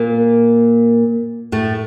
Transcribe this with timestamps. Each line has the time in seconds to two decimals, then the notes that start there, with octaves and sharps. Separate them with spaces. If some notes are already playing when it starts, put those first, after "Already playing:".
Already playing: A#2 A#3
1.52 A2 A3